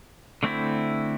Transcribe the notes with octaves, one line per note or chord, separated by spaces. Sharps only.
D3 A3 C4 E4